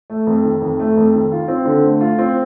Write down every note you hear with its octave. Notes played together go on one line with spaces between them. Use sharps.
A3
F2
D#3
F2
A3
F2
D#3
F4
C4
D3
A3
F4
C4